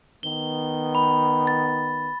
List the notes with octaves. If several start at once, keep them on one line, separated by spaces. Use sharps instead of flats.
D#3 B3 G7
B5
A6